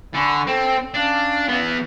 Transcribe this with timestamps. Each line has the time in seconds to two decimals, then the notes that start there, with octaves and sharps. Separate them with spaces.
0.14 D3 G#5 B5 C#6
0.47 C4 A4 G5
0.94 C#4 D4 F5
1.48 E3 B3